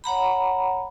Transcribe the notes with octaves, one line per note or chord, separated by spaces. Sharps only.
C#5 F#5 A#5 B5